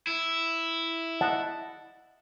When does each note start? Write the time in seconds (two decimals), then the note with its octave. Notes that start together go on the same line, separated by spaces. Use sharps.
0.07 E4
1.21 D#5 F#5 A5